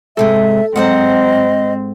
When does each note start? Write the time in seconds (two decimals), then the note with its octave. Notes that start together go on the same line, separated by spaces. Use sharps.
0.17 G#2 C3 G#3 A4 E5
0.76 G#2 F#3 C4 C5 D#5 F#5